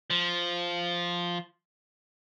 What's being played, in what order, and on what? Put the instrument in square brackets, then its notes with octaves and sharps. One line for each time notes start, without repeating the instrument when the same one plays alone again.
[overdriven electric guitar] F3